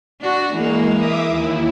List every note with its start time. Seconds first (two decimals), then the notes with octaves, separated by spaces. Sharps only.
0.21 D4 F#4
0.53 E3 G#3 A#3
0.96 E5 D6 D#6
1.29 D#2 E4